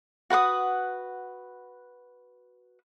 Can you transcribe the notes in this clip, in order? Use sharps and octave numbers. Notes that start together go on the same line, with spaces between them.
F#4 B4 F#5 D#6